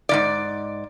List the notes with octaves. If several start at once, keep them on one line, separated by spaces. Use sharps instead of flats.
G#2 D#3 D5